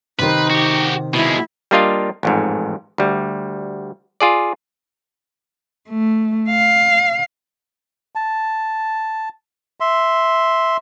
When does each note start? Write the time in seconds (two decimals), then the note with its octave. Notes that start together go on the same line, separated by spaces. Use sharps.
0.19 C3 D#3 D#4 B4 C5
0.50 F#4 G4
1.14 B2 G#3 E4
1.71 G3 A#3 D4 F4 D#5 F5
2.23 A1 F2 G#2
2.98 D2 G3
4.20 F4 G#4 D5
5.89 A3
6.50 F5
8.15 A5
9.80 E5 C6